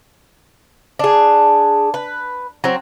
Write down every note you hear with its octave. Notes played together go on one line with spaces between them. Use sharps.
D4 G#4
B4
F#3 C4